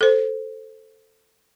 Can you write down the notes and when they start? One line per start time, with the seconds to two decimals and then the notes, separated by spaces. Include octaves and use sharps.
0.01 A4 C5